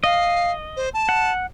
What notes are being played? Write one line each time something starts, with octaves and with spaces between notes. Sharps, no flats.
D#5 F5
C5
A5
F#5